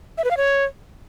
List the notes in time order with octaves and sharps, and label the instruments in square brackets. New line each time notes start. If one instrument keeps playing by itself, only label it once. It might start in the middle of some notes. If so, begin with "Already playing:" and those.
[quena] E5
B4
F5
C#5